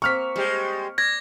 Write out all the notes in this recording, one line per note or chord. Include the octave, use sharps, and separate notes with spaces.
A#3 C4 C#6 F6 B6
G3 G#3 G4 C5
D5 G#6 A#6